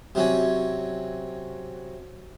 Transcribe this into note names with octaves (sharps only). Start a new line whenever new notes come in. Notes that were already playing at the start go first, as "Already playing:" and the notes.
C3 F#3 C#4